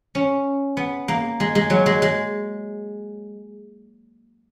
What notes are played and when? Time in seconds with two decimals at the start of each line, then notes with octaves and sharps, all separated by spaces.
0.15 C#4
0.77 B3
1.08 A#3
1.40 G#3
1.55 G#3
1.70 F#3
1.86 G#3
2.02 G#3